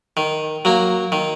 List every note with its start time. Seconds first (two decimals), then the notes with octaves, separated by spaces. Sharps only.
0.17 D#3
0.65 F#3 A#3
1.12 D#3